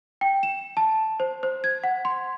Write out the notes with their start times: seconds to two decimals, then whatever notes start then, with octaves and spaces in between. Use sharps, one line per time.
0.21 G5
0.43 E7
0.77 A5
1.20 C5
1.43 C5
1.64 G#6
1.84 F#5
2.05 C6